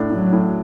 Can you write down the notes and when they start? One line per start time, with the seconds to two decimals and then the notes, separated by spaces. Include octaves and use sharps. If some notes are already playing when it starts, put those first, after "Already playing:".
Already playing: A2 D4
0.10 A2 F#3
0.33 A2